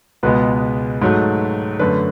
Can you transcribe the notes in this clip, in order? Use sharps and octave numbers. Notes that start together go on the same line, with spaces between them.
C#2 B2 G#3 B3 B4
G#2 F#3 A3
F#2 D3 A3 B4